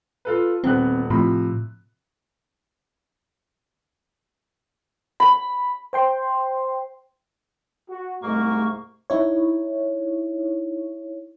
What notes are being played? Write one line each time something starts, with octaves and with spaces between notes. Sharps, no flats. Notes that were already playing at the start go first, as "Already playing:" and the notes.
F4 A4 B4
D#1 B3 C4 F#6
A2 C3 F3 B5
B5
C5 G5 C6
F#4
C2 G#2 A3 A#3 C#6
D#4 E4 C#5